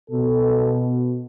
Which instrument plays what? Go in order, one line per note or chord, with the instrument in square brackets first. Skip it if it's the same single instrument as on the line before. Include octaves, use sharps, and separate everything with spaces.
[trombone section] B2 A4